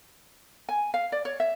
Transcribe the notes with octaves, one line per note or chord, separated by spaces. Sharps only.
G#5
F5
D5
C#5
E5